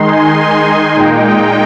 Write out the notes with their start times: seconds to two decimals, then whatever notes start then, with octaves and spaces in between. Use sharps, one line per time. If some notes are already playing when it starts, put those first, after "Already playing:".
Already playing: D#3 G#3 D#4 C6
0.09 G#5
0.97 A#2 G#3 D#4 G5